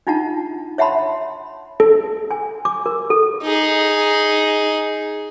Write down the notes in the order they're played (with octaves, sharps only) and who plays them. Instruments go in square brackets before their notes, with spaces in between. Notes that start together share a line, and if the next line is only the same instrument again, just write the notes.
[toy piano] D4 D#4 F4 F#5 A5
C#5 E5 F#5 A5 B5 C6
[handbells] A4
[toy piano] G#5
D6
A#4
A4
[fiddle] D#4 G#4